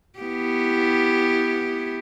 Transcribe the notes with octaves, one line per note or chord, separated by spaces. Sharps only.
B3 E4 G4